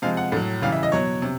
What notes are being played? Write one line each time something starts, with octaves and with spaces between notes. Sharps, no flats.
C3 F3 G#3 F5
F#5
A2 F#3
C#3 E3 G3 F5
E5
D#5
B2 F#3 C#5
C3